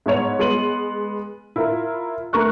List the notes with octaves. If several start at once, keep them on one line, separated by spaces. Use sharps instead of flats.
G#2 B3 C#5 F7
G#3 B3 C6 D#7 F#7
E4 F4 A#4
A3 A#4 C#6 F#6